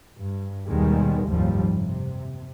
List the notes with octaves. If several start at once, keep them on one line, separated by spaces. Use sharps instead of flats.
G2
D#2 B2 D#3 G3 G#3
F#1 D#2 G#2 F3 G3
C3